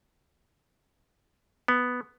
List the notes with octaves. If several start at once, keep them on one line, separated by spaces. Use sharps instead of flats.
B3